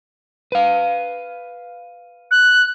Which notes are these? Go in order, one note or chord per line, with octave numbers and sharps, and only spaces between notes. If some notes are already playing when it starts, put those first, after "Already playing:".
B4 F5
F#6